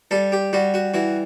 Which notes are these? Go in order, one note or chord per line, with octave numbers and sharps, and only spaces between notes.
G3 A4
G4
G3 F#4
F#4
E3 F#4